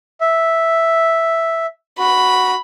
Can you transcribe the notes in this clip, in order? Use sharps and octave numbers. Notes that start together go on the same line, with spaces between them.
E5
F#4 B5